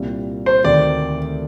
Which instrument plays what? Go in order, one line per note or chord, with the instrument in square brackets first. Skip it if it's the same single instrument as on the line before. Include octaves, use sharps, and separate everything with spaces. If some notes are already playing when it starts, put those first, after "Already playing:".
Already playing: [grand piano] C2 A#2 G3 A#3
[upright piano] C5
[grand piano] D2 C3 D#3 [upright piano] D5